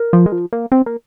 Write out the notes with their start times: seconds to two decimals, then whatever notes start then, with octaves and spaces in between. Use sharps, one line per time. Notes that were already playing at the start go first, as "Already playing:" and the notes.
Already playing: A#4
0.13 F3
0.26 G#3
0.32 F3
0.53 A#3
0.72 C4
0.86 A#3